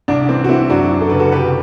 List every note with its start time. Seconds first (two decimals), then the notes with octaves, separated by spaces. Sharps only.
0.08 C2 D4
0.28 E3 C4
0.44 F#4
0.49 E3 C4 E4
0.70 F#2 D4 F#4
0.91 E3
1.01 A4
1.10 F#1 B4
1.19 F#4 A4
1.32 C2 G4 B4